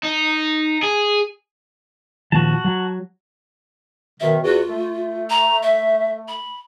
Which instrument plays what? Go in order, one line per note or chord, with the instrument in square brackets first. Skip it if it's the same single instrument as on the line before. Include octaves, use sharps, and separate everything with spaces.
[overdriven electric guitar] D#4
G#4
[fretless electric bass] D#1 D#2 F3 [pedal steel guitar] F#4 A5
[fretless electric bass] F#3
[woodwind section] F#2 B2 D#3 [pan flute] E5
[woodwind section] E2 F#4 [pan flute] F4
[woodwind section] A3
[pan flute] A#5
E5
B5